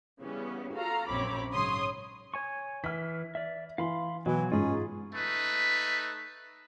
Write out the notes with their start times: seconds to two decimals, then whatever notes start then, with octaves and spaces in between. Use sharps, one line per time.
0.21 C#3 E3 G3 B3 C#4
0.74 F4 F#4 A4 F5 A#5
1.10 A#1 F#2 C4 C#5 B5 D6
1.52 G#2 C#3 F#3 C#5 C6 D#6
2.34 C#5 G#5 C#6
2.84 E3 F6 B6
3.35 D5 E5
3.78 E3 F5 B5 C6
4.26 B2 E3 F#3
4.52 G#2 G#3 C#4 F4 G#4
5.13 A3 D#4 B4